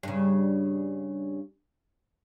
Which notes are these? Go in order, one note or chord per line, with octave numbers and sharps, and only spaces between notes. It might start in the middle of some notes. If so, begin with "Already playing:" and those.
G2 C#3